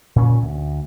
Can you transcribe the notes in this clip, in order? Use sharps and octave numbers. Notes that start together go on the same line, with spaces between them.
A#2 C#4
D2